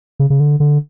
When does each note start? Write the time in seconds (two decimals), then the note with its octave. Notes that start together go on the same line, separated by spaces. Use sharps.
0.20 C#3
0.30 C#3
0.40 D3
0.60 D3